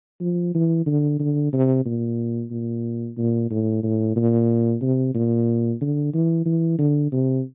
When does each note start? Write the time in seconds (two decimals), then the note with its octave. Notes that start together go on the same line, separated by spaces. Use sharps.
0.20 F3
0.54 E3
0.86 D3
1.19 D3
1.53 C3
1.85 A#2
2.51 A#2
3.17 A#2
3.50 A2
3.83 A2
4.16 A#2
4.82 C3
5.14 A#2
5.81 D3
6.13 E3
6.45 E3
6.78 D3
7.12 C3